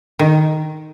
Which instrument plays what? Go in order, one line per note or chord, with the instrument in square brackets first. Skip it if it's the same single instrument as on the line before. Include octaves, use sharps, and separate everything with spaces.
[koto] D#3